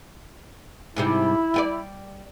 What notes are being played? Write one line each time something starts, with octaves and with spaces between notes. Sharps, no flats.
G#2 C3 G3 E4
G3 G4 D5